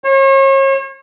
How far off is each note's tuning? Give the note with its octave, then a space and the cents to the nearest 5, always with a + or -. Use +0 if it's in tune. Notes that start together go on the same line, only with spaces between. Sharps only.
C#5 -40